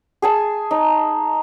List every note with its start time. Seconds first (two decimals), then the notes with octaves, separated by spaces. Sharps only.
0.22 G#4 G#5 A5
0.71 D#4